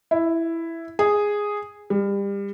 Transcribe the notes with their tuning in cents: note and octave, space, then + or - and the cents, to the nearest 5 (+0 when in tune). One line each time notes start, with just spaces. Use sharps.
E4 +5
G#4 -5
G3 +30